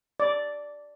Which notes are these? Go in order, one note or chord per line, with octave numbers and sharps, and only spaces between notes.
D5